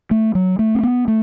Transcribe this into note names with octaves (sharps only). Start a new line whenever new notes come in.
A3
F#3
A3
C4
B3
A3